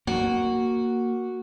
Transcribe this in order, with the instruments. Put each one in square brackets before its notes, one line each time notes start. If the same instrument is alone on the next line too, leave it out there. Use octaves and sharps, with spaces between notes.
[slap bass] A#3 [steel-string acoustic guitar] F#4